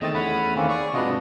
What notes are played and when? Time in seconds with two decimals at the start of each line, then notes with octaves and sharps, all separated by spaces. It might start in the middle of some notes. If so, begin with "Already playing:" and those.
0.01 E2 D#3 A3 C4 D#5 A6
0.14 C#4 E4 F#5 B5
0.56 D#3 A#3 C4 C#4
0.69 G#4 D5 C#6
0.94 G#2 C3 D4 F4 F#4 B4 D#5